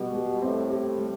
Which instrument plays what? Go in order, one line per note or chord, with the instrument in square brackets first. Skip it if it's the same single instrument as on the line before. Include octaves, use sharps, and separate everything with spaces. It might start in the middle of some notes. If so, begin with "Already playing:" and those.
Already playing: [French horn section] B2 [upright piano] G3 G4
[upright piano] G3
[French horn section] A2 [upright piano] C4
[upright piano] G4
G3